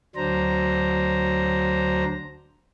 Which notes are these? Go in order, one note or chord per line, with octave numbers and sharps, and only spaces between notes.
D2 F#3 D4 C5 A#5